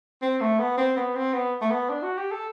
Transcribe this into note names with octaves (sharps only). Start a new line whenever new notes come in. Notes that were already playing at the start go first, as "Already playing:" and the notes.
C4
A3
B3
C4
B3
C4
B3
A3
B3
D4
F#4
G4
A4